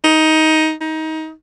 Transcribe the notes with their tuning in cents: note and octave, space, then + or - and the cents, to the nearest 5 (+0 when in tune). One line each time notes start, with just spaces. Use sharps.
D#4 +15
D#4 +25